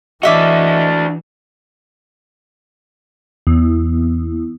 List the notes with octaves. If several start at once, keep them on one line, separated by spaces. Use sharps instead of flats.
E3 D4 F#4 D#5 E5 D6
E2